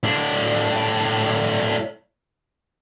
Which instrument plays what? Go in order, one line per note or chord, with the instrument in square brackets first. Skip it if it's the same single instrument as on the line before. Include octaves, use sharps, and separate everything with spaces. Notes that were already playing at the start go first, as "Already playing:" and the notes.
[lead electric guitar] A2 D4